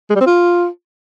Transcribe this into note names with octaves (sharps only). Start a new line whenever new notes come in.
G#3
G3
C4
F4